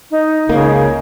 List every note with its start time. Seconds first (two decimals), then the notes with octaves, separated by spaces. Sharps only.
0.11 D#4
0.49 C#2 C#3 A#3 C#4